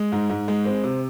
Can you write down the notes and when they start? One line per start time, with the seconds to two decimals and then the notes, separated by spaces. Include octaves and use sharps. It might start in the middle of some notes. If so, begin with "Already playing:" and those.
Already playing: G#3
0.12 G#2
0.29 G#2
0.48 G#3
0.65 C4
0.84 C3